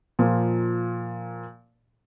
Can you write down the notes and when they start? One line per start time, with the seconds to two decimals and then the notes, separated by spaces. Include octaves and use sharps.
0.19 A#2 F3